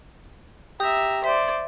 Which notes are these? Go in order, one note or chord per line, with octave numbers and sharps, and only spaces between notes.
G4 E5 A#5 D#6 G6
C5 D5 E5